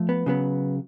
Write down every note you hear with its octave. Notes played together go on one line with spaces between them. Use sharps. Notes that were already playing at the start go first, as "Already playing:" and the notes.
Already playing: F3 A3
B3
C#3 F#3 B3